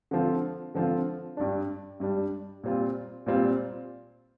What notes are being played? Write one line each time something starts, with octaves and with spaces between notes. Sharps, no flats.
D3 F3 C4 F4
D3 F3 C4 F4
G2 G3 D4
G2 G3 D4
A#2 G3 C4 F4
A#2 G3 C4 F4